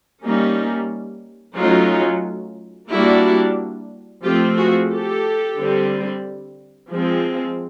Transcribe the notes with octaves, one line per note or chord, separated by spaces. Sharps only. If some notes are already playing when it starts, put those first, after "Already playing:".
G3 A#3 C#4 D#4
F#3 A3 C#4 D#4 F4
G3 A#3 D4 E4 F#4
F3 A3 C4 F4 G4
F#4 G#4
G4 A4
D3 G3 C4
F3 G#3 C4